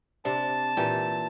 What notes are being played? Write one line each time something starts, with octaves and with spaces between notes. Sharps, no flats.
C3 D4 A5
A#2 E3 G4